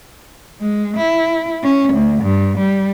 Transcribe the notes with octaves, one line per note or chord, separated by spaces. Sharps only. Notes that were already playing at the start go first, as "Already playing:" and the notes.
G#3
E4
C#4
D2
G2
G3